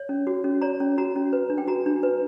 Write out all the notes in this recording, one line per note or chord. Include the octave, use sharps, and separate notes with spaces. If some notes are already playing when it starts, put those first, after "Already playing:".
Already playing: C#5
C#4
F#4
C#4
C#5 A#5
C#4
F#4 A#5
C#4
B4
D4
G5
F#4 A#5
D4
B4